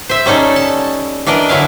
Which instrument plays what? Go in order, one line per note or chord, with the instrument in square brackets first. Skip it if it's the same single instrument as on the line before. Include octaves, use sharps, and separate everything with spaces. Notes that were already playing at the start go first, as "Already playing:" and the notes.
[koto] C5 E5
G3 C#4 D#4 A4
A5
E3 D4 A#4 D5 D#5
D3 F#3 E4 F5